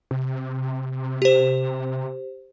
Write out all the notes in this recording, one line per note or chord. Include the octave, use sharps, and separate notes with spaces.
C3
G4 C5